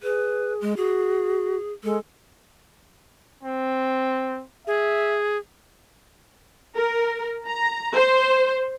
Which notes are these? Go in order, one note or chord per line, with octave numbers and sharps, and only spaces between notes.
G#4 B4
G#3
F#4 G#4
G#3 A4
C4
G#4 E5
A#4
A#5
C5